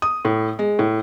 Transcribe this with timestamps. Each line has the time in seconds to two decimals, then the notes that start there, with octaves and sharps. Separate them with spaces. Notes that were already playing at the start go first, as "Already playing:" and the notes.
0.02 D#6
0.25 A2
0.59 G#3
0.79 A2